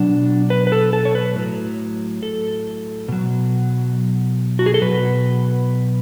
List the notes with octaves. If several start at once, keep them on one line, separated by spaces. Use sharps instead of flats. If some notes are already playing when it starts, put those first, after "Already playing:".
Already playing: B2 F#3 D4
B4
B4
A4
A4
C#5
B4
A2 F#3
A4
B2 F#3
F#4
G#4
A4
B2 F#3 B4